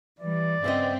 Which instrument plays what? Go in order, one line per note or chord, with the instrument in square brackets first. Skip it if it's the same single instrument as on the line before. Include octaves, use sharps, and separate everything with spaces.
[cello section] E3 G3 [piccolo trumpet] D5
[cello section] G2 E5 [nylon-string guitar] C#3 B3 D#5 [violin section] C4